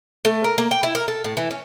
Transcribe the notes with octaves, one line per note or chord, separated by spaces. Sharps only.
A3
A#4
A#3
G5
E4
A#4
A4
A2
E3
C#4